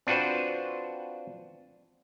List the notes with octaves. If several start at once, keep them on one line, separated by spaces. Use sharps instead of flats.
C4 D4 F4 F#4 B4 C5